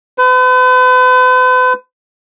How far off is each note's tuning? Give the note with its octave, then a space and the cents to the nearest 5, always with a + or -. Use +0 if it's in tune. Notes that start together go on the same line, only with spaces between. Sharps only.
B4 +40